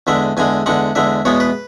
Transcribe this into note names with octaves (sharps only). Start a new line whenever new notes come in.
E2 D3 G#3 E5
E2 D3 G#3 G#5
E2 D3 G#3 F#5
E2 D3 G#3 E5
E2 B2 G#3 B3 C#5
B4